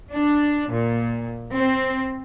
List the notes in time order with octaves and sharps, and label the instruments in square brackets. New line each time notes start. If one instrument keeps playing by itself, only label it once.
[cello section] D4
A#2
C4